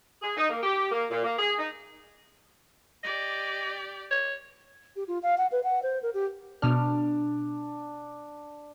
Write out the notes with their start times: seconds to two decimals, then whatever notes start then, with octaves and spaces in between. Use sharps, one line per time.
0.22 G#4
0.37 D#4
0.50 A#3
0.63 G4
0.92 A#3
1.10 A#2
1.24 A#3
1.39 G#4
1.59 D#4
3.03 G4 D5 D#5
4.11 C#5
4.96 G4
5.08 F4
5.23 F5
5.38 F#5
5.52 B4
5.63 F#5
5.83 C5
6.02 A#4
6.14 G4
6.62 B2 D4 F6